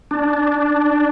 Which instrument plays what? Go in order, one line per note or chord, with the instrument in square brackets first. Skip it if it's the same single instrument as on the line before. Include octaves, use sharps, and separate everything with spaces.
[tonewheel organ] D4